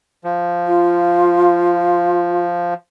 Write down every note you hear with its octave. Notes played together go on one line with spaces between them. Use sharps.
F3
F4